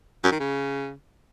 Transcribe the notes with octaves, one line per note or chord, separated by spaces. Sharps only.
F#2
D#3
C#3